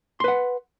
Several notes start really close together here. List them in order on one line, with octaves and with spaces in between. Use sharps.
C6 B4 F#5